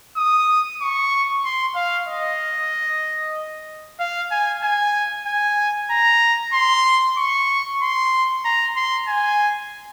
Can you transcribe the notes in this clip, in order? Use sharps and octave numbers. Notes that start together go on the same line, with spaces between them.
D#6
C#6
C6
F5
D#5
F5
G#5
G#5
G#5
A#5
C6
C#6
C6
A#5
C6
G#5